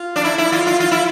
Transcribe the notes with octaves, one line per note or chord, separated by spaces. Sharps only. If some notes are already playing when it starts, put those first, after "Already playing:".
Already playing: F4
D4
E4
E4
F4
F4
F4
E4